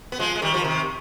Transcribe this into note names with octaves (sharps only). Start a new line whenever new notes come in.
B3
F3 G#3
G#3
D#3 G3
F3
C3 D#3